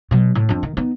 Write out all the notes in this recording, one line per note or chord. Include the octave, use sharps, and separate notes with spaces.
B2 F#3
A2
F2 D4
D#3
B3 D#4